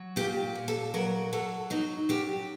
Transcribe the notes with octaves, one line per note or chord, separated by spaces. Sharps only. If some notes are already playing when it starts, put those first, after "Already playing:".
Already playing: F#3
A#2 G4
A#2
A4
F#3 A#4
F#3 A4
F#3 D#4
F#2 G4